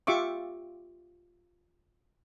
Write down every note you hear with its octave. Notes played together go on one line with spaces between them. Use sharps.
F4 G4 E5 C#6 D6